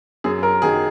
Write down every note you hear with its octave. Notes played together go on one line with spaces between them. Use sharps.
F#2 G#4
A#4
D#3 F#3 G#4